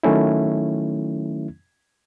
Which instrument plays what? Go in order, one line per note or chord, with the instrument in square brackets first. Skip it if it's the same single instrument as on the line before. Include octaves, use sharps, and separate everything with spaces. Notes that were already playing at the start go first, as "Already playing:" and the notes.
[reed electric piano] D#3 F#3 A3 C#4 E4